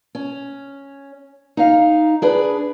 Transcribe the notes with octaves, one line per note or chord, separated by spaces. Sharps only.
C#4
D#4 F5
D4 G#4 B4